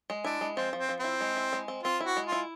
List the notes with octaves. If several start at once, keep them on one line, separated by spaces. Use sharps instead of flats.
G#3
D4 E4
G#3
F3 C4
F3
C4
F3
C4 E4
G#3
E4
G#3
C4
C4 F4
E4 F#4
G#3
F4
E4